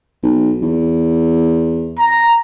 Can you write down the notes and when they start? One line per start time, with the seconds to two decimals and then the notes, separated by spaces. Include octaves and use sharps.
0.23 B1
0.62 E2
1.99 A#5